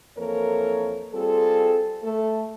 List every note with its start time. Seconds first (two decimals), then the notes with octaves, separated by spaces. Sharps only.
0.17 F2 E3 A#3 A4 A#4 C#5
1.14 G3 C4 F4 G#4 A4
2.03 A3 A4